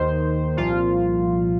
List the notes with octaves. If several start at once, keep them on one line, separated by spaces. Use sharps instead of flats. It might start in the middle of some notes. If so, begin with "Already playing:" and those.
Already playing: D#2 D#3 C5
C2 A#2 F3 F4